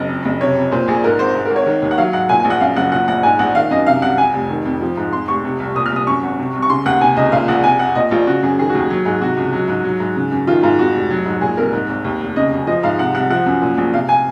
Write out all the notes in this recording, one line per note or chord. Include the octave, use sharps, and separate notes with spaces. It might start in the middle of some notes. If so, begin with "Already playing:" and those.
Already playing: F#1 D#5
F2
F#1
C3 C#5
F2
A#2 C5
A#1 G#4
G#2 A#4
G#1 C5
G#2
A#4
G#1
C#5
D#3
D#2
F#5
F#3 F5
G#2 F#5
A#2 G#5
A#1 G#5
F#5
F#2 F5
F#1 F#5
A#2 F#5
A#1 F#5
G#2 G#5
A#1 F#5
D#3 F5
F#2 D#5
C3 F5
C2 F#5
F2 G#5
F1
D#3
F2
F3
G#2
F2 C6
F1 C#6
C3
C2
A#2 D#6
F6
C2 D#6
F#2 C#6
G#1
C3
C2
C#6
C#3 C6
D#2 F#5
C3 G#5
C#2 D#5
A#2 F5
A#1 F#5
C3 G#5
F2 F#5
A#2 D#5
A#1 F4
C#3 F#4
F#2 G#4
D#3 G#4
F#4
D#2 G#4
F#3
G#2 G#4
C3 F#4
C#2
F#3
G#2
F#3
G#2
C#3
F#2
D#3 F4
G#2 F4
F2 F#4
F1
F#3
G#2
A#2 G#4
C2 A#4
G#2
G#1
D#2
F1
C#3 D#5
F#2
F3 D#5
G#2 F5
C3 F#5
C2 F#5
F3 F#5
F#2
A#2
A#1
C3 F5
G#5